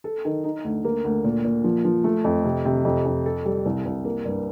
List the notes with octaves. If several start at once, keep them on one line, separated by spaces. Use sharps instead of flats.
A4
D#3
D#4
D2
A#3
D2
A#2
A#2
F3
F3
A3
F2
C3
C3
F2
F2
A4
G3
C2
C2
A#3
G2